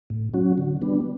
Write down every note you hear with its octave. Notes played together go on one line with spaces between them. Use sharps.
A2
F#3 C#4 F#4
D3
G3 B3 D4